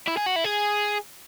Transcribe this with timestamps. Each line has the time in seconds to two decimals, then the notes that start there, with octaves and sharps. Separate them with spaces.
0.07 E4
0.17 G#4
0.26 F#4
0.36 E4
0.44 G#4